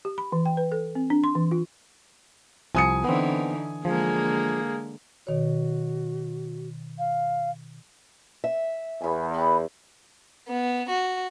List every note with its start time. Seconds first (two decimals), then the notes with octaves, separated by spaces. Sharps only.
0.05 G4
0.18 B5
0.32 E3
0.46 G5
0.57 B4
0.72 A4
0.95 C4
1.10 D4
1.24 C6
1.35 E3
1.51 F4
2.75 C2 F3 G#5 D#6 C#7
3.04 D3 E3 B3 C4 D#4
3.85 D3 F3 G#3 A#3 G#4
5.27 B2 D#3 F#4 C#5
6.98 F5
8.44 E5
9.01 E2 G#5 B5
9.34 B3 G4 B4
10.48 B3
10.89 F#4